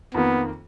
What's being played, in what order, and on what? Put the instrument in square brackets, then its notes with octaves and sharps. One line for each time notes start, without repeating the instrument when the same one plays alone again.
[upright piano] F2 D#3 A#3 [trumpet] B3